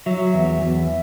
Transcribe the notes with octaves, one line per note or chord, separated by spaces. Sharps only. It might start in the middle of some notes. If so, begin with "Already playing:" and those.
F#3 E5
E2
E2